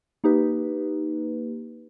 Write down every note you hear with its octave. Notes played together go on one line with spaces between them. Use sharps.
A#3 D#4 G4 B4